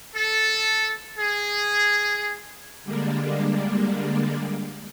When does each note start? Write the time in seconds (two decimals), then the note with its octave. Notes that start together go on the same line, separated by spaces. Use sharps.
0.16 A4
1.19 G#4
2.83 D3 G3 G#3 A#3 D4